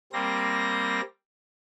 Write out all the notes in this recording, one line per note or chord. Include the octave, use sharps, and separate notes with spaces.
G3 A#3 C4 A#6